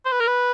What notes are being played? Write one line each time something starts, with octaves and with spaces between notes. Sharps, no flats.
C5
B4
A#4
B4